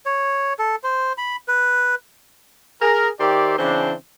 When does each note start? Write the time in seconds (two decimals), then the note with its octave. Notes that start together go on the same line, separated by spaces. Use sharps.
0.06 C#5
0.59 A4
0.84 C5
1.18 B5
1.48 B4
2.82 G#4 A#4
3.19 D#3 G4 C5 D5 E5
3.58 C#3 E3 C4 D4